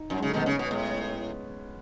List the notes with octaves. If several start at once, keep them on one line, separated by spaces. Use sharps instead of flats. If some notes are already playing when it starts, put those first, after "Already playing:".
Already playing: D#4
F#2 F#3
C#3 G#3
A3
B2 D#3 B3
C#3 C#4
B2 B3
A2 G#3